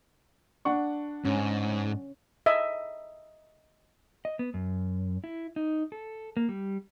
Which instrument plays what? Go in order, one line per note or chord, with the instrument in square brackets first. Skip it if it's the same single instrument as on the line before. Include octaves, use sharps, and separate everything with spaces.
[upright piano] D4 F#5 C#6
[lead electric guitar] G#2 [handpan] C#4
[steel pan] D#5 E5
[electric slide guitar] D#5
B3
F#2
E4
D#4
A4
A#3
G3